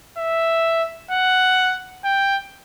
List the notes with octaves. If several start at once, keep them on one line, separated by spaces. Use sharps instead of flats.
E5
F#5
G5